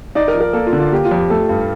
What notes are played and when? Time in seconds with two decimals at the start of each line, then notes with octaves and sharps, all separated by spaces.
0.15 D#4 D5
0.28 A#4
0.34 F3
0.40 A#4
0.53 A#3 A4
0.67 F4
0.73 D3
0.79 F4
0.92 A#3 G4
1.05 F4
1.11 F2
1.17 G4
1.30 A3 A4
1.49 G2